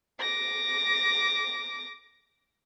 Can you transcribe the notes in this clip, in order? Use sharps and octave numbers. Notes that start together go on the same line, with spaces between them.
D6 A#6